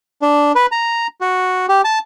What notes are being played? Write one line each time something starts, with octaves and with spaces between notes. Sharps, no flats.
D4
B4
A#5
F#4
G4
A5